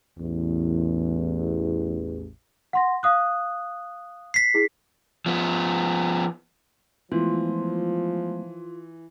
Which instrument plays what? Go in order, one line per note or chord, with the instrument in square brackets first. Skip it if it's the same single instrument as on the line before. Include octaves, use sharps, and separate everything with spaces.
[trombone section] A1 E2
[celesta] F#5 C6 A#6
F5 D#6 F#6
[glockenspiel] B6 C7
[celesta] E4 G#4
[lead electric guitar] F3 B3
[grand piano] E3 [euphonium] F3 [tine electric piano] G#3 A3 B3 [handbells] F4